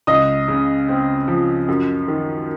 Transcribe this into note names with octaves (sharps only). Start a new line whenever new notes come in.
C#2 D#5 D#6
C#3
C4
F3
F#2
D#3